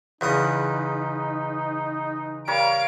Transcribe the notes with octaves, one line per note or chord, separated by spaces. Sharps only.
E2 C#3 D#4 B4 D#6
G3 A#4 C#5 F5 D7